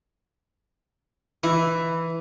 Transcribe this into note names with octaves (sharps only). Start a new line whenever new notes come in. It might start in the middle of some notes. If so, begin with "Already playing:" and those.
E3 E4